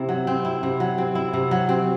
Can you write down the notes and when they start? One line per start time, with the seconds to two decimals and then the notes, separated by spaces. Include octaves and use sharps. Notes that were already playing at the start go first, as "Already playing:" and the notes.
Already playing: C3 C4 E4
0.09 F#3
0.27 C4
0.45 E4
0.63 C3
0.80 F#3
0.98 C4
1.15 E4
1.34 C3
1.51 F#3
1.69 C4